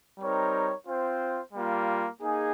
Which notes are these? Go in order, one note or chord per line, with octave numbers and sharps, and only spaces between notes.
G3 C4 D#4 A#4 C#5
C4 F4 C5
G3 A#3 F4
A#3 D#4 G#4